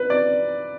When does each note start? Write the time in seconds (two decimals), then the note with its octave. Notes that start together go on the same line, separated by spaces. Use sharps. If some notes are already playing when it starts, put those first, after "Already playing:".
Already playing: B4
0.10 D5